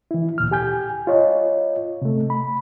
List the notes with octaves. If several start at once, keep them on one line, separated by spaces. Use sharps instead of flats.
E3 E4
D2 A#2 F6
G4 G#5 G6
F4 C#5 D#5
C3 A3
B5